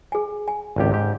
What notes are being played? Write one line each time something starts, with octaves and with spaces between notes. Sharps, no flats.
G#4 G#5
G#5
G#1 C#2 G4
G#2 G4